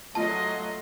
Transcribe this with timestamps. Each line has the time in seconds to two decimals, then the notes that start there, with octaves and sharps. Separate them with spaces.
0.15 F3 F#3 A3 F4 D#5 A5 C6